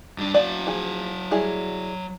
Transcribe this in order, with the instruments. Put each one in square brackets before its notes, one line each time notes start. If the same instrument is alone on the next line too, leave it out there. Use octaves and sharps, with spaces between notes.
[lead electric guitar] G2 D4
[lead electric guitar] F#3 F5 [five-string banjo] D5 A5
[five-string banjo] F3 G#4
G3 E4 G#4